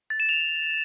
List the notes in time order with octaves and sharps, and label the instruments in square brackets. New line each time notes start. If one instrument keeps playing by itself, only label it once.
[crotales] A6
E7
F7